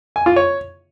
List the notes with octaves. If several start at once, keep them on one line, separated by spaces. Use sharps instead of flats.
G#5
F4
C#5